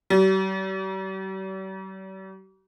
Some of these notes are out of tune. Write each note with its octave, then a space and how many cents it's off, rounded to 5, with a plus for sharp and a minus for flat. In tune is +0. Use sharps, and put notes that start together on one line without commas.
G3 -45